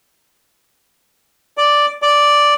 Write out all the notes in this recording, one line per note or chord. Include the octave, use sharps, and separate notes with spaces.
D5
D5